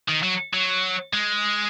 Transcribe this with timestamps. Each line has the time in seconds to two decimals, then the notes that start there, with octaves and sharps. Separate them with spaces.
0.09 D#3
0.23 F#3
0.54 F#3
1.13 G#3